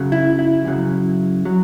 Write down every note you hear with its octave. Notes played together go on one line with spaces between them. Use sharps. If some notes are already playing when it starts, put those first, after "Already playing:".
Already playing: F#2 C#3 F#3
E4
E4
F#2 C#3 F#3
F#3